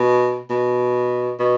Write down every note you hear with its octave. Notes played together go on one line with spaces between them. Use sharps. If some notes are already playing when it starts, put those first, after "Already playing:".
Already playing: B2
B2
B2